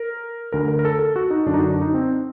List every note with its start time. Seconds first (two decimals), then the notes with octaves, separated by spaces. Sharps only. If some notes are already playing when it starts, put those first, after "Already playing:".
Already playing: A#4
0.52 D2 D3 A#4
0.68 A#4
0.79 A#4
0.85 A4
0.99 A4
1.16 F#4
1.30 D#4
1.46 F#2 D3 D4
1.54 D#4
1.59 F#4
1.70 D4
1.81 D#4
1.94 C4